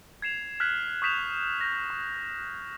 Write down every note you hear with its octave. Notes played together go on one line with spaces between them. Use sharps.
G#6 C7 E7 F7
F6 F#6 G#6 B6 F#7
C#6 D#6 G6 B6 E7 F7
G6 A#6
C#6